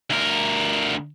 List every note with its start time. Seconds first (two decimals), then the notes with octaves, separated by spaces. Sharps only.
0.10 D2 A#4